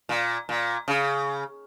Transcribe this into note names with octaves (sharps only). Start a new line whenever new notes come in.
A#2
A#2
C#3